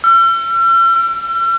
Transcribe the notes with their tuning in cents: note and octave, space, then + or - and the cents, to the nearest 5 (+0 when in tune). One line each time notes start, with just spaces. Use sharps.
E6 +45
E6 +25